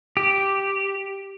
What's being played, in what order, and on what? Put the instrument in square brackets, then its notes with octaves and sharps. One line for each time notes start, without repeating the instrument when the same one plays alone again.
[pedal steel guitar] G4